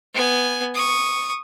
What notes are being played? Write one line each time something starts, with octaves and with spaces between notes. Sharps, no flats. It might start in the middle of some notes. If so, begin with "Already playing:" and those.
B3 G#5
C#6 D#6